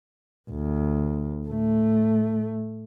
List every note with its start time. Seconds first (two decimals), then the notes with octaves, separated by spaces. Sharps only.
0.50 D2
1.47 A2 A3